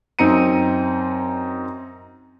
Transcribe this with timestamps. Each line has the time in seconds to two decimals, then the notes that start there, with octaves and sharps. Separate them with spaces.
0.19 F#2 C4 D#4 A#5 C#7 D#7